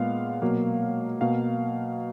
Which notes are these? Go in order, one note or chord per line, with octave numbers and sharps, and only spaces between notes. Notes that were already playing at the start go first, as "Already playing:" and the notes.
Already playing: A#2 G#3 B3 F5
B2 F#3 A#3
B2 A#3 F5